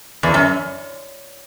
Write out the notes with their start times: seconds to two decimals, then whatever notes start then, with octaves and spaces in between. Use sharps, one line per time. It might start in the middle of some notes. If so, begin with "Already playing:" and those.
0.23 E2
0.34 F#2